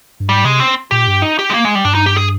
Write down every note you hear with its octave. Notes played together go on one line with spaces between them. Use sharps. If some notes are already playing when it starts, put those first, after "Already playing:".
G2
G#2 G3
C3 G#3
C4
A#2 G4
G2
D#4
G4
G#3
A#3
G#3
G3
G2 D4
D#4
G4
G#4